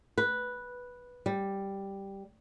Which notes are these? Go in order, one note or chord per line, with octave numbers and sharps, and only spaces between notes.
B4
G3